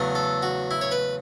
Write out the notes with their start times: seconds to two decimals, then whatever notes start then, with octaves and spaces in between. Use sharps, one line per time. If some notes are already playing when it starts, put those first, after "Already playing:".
Already playing: E2 C#3 F#3 A3
0.15 A4
0.43 F#4
0.71 E4
0.81 C#5
0.92 B4